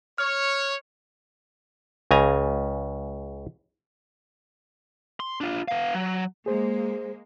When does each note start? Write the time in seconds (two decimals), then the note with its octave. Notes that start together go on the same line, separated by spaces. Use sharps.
0.18 C#5 F6
2.11 C#2 C#3 G#5 A#5
5.20 C6
5.41 D4 F4
5.68 B3 F5
5.94 F#3
6.46 G#3 A#3 G#4 C5